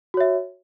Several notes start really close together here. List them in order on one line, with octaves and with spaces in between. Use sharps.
F#4 C#5 E5